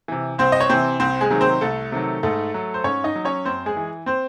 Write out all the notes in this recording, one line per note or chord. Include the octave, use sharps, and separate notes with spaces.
C3 E3
C2 C4 C5
D#5
C#5
C3 E3 C4 C5
C2 C4 C5
G#3 G#4
C3 D#3 F#3
C4 C5
C2 A3 A4
C3 D#3 F#3
G#2 A3 A4
F#3
C5
G#2 C#4 C#5
D#4 D#5
F#3
C#4 C#5
F#2 C4 C5
G#3 G#4
E3
C4 C5